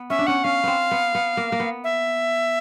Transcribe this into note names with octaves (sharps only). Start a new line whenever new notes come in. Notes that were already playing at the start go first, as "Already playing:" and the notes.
Already playing: B3
C#4 E5
D4
C#4 F#5
C#4 F5
B3 C4
B3
B3
A#3
A#3
B3
E5